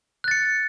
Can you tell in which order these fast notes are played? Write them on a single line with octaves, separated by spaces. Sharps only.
F#6 A6 C#7